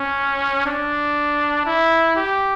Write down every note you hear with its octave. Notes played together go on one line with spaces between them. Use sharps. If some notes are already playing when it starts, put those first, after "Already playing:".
Already playing: C#4
D4
E4
G4